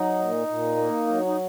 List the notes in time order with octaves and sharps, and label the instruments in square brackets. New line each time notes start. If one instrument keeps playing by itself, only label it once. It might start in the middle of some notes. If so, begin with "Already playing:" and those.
Already playing: [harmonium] F#3 D#4
A#2
A#2
A#3
F#3
D#4